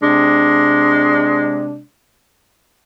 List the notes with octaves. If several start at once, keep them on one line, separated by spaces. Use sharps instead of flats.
C3 G#3 D4